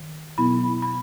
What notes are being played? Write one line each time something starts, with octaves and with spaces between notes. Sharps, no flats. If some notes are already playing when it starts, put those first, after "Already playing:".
Already playing: D#3
B2 F#3 B3 E4 B5
B5